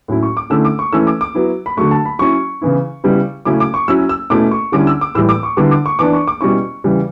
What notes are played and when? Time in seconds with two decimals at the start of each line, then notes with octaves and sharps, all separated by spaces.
0.08 A2 F#3 C#4 E4
0.23 C#6
0.37 D6
0.50 D3 A3 C#4 E4 E6
0.65 D6
0.79 C#6
0.93 E3 A3 C#4 E4 E6
1.07 D6
1.21 D6
1.35 F#3 B3 E4
1.66 B5
1.77 D3 F#3 A3 C#6
1.91 A5
2.05 B5
2.19 F#3 C#4 E4 C#6
2.61 C#3 E3 B3 E4
3.04 C#3 G3 B3 E4
3.45 C#3 F#3 A3 C#4 E4 D6
3.60 D6
3.74 C#6
3.88 F#3 C#4 E4 E6
4.09 E6
4.30 B2 A3 C#4 E4 D6
4.51 C#6
4.72 D3 G3 C#4 E4 D6
4.87 E6
5.01 D6
5.15 A2 E3 G3 E6
5.29 D6
5.43 C#6
5.57 D3 G3 B3 E4 D6
5.71 D6
5.86 C#6
5.99 E3 B3 D4 D6
6.13 C#6
6.27 D6
6.41 B2 G3 C#4 E4 C#6
6.84 C#3 E3 G3